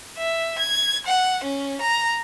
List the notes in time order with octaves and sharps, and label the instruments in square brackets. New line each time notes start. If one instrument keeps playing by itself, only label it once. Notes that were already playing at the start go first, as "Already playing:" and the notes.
[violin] E5
G#6
F#5
C#4
A#5